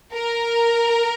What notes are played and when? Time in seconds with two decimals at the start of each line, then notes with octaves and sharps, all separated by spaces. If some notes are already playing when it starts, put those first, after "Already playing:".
0.14 A#4